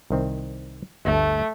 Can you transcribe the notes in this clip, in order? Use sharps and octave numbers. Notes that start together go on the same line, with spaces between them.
C2 D#3 C4
G1 D2 A3 A5